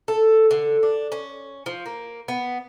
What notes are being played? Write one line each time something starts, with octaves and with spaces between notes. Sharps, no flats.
A4
D3
D4
C#4
F3
A#3
B3